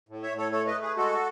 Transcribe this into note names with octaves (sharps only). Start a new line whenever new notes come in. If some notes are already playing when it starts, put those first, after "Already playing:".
A2
C#5 E5
A2
A4 C#5
A3 A4 C#5
B4 D#5
A3
G#4 B4
G#3 F#4 A4